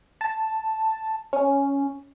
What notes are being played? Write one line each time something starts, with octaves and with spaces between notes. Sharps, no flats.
A5
C#4